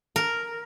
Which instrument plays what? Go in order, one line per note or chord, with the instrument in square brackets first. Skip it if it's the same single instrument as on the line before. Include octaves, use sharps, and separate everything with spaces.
[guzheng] A#4